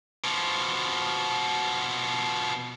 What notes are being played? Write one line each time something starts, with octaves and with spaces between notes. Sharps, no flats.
B2 F3